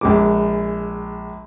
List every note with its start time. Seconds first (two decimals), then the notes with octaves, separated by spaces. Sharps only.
0.01 A#1 G#3 D6